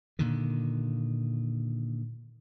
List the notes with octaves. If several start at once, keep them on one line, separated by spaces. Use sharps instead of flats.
A#2 D3 D#3